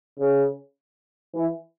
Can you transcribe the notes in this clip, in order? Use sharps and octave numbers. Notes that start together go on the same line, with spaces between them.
C#3
E3